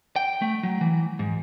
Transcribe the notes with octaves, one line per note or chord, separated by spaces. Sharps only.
G5
A3
F#3
E3
G#2